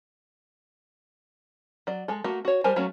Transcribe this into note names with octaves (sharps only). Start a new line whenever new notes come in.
F#3 D5
G#3 A4
A3 A#3 F#4
F#4 C#5
G3 A#4 C5 G#5 A5
F#3 A3 A#3 C#4